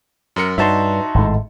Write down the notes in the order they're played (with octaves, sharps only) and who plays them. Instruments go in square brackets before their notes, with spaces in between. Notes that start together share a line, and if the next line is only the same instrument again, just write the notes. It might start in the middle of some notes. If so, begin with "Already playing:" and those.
[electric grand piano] F#2 A#4 C#7
[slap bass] G2 [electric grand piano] D#4 F#4 C#5 [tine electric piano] E5 A5 C6
[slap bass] G#1 A2 G#3